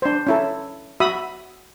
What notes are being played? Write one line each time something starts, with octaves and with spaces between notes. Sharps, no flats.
D4 C5
C#4 E4 A4
F#4 E5 B5 D#6